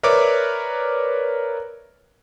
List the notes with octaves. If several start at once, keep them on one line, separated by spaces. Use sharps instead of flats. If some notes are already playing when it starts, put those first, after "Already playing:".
A#4 B4 C#5 D5 E5 D6